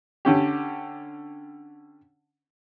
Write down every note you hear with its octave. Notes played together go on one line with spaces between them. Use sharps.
D3 C#4 G4